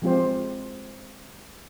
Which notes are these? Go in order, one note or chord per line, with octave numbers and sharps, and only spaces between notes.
F3 G#3 C4 F4 G4 C5